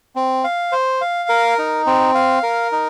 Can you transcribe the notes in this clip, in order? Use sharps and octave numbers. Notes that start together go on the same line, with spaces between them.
C4
F5
C5
F5
A#4
D#4
C4
F5
A#4
D#4